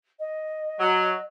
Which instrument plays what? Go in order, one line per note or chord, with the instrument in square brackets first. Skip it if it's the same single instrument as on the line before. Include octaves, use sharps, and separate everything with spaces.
[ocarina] D#5
[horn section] F#3